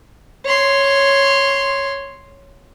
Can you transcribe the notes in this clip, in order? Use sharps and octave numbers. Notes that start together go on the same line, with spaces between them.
C#5 C6